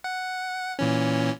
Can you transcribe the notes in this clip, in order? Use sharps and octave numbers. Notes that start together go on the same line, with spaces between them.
F#5
A#2 E3 C#4